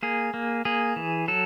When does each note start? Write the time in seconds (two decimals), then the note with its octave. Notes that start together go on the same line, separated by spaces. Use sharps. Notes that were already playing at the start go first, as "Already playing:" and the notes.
0.03 A#3 G#4
0.34 A#3
0.65 A#3 G#4
0.96 E3
1.28 F#3 A4